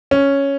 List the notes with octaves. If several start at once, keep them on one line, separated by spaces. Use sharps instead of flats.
C#4